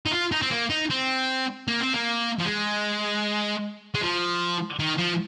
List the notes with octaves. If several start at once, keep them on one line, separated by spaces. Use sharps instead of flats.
D#4
F4
D#4
C4
A#3
D#4
C4
A#3
C4
A#3
F3
G#3
G#3
F3
D#3
F3